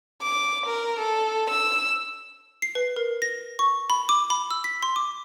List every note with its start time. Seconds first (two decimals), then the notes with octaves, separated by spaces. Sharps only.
0.22 D6
0.66 A#4
0.99 A4
1.50 E6
2.62 C7
2.75 B4
2.96 A#4
3.22 A#6
3.59 C#6
3.90 B5
4.09 D6
4.30 B5
4.51 E6
4.64 B6
4.83 C6
4.96 D6